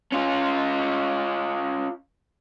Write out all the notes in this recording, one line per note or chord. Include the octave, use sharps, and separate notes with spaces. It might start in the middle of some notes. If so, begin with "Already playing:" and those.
C#4 F4